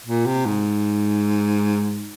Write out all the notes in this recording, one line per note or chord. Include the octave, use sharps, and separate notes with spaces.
A#2
C3
G#2